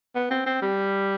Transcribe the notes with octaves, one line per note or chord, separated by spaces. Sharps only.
B3
C4
C4
G3